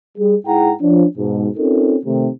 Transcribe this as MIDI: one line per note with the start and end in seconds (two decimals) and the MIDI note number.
0.18 0.35 55
0.18 0.35 68
0.47 0.73 44
0.47 0.73 64
0.47 0.73 68
0.47 0.73 78
0.47 0.73 79
0.47 0.73 82
0.81 1.06 53
0.81 1.06 61
0.81 1.06 62
1.18 1.47 44
1.18 1.47 47
1.57 1.97 60
1.57 1.97 61
1.57 1.97 63
1.57 1.97 65
1.57 1.97 69
1.57 1.97 70
2.06 2.29 48
2.06 2.29 51
2.06 2.29 57